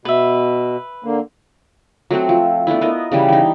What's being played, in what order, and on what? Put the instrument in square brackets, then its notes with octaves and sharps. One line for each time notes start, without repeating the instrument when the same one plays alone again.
[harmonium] B2 [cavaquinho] B4 E5
[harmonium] D3 A#3
[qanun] F#3 A3 C4 F#4
F3
A3 B3 D4 E4
B3 A#4 D#5
C#3 E3 G3
E3 D#4